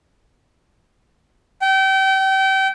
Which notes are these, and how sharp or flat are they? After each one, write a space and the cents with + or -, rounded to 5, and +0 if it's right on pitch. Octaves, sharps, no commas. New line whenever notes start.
G5 -30